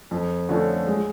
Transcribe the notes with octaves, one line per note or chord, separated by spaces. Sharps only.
F2
D3 F3 A3 C#4
G#3